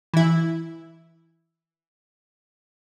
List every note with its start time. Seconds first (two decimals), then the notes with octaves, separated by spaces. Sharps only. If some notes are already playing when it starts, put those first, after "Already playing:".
0.14 E3 E4